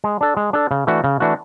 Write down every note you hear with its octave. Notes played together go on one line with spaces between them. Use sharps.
G#3
D4 A4
G#3
D4 A4
C#3
E3 A3 D4 F#4
C#3
E3 A3 D4 F#4